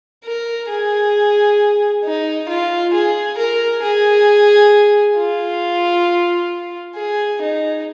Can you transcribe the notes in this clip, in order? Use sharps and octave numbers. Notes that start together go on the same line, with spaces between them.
A#4
G#4
D#4
F4
G#4
A#4
G#4
F4
G#4
D#4